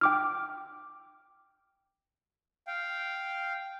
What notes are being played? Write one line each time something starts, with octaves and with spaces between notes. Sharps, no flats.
G5 D6 F6
F5 G5